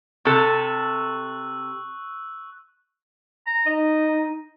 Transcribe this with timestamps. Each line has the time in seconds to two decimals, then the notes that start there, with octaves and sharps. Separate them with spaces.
0.25 C3 A4 C#6 E6 F#6
3.47 A#5
3.66 D#4 D#5